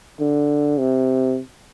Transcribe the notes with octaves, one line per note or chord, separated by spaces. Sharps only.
D3
C3